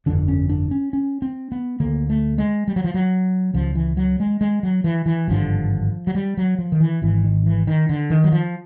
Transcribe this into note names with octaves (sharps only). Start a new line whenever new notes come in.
G1 F2 D3 D4
C#4
D4
C#4
C#4
C4
B3
D2 D3 A#3
A3
G#3
G3
F#3
F3
F#3
C#2 C#3 F3
E3
F#3
G#3
G#3
F#3
E3
E3
G#1 G2 D3 F3
F#3
G3
F#3
F3
D#3
E3
G#1 G#2 E3
D#3
E3
D#3
D3
D#3
F#3
F3